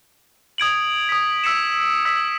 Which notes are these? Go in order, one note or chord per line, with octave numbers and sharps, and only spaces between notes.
D#6 G#6 D7 F#7
D#6 B6
E6 B6 C#7 E7
E6 B6